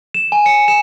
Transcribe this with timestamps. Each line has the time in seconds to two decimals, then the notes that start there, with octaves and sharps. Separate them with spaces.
0.14 E7
0.32 G#5
0.46 C#7
0.68 E7